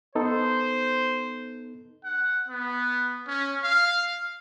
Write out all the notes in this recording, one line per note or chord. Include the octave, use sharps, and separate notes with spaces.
B3 D#4 A4 C5
F#5
B3
C#4
F5